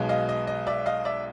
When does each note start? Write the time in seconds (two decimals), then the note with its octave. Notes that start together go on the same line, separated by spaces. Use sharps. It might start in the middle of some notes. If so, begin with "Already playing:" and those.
Already playing: B1 B2 G#3
0.09 D#5 F5
0.29 D#5
0.47 D#5
0.66 D5 E5
0.86 D#5 F5
1.05 D5 E5